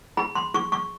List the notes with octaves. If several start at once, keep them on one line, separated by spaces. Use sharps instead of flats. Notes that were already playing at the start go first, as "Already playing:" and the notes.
G#4 B5
C6
G#4 C#6
C#6